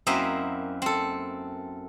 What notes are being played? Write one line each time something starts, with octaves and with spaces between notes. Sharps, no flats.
F#2 A#3 C4 E4 D#5 E5
C4 A4